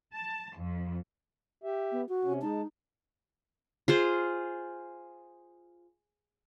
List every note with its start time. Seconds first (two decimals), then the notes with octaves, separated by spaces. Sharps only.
0.13 A5
0.58 F2
1.64 G4 E5
1.92 B3
2.09 F#4
2.24 C3 C#4
2.42 G#3 D#4 A5
3.88 F4 G#4 C5